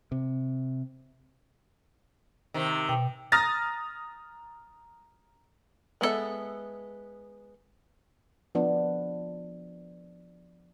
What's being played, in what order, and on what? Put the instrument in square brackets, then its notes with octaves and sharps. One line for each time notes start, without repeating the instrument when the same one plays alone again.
[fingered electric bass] C3
[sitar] C3 D#3
[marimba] B2 G5
[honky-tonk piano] A#5 D#6 F6 A6 A#6
[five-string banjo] G#3 B3 C4 A4 E5
[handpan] F3 B3 D4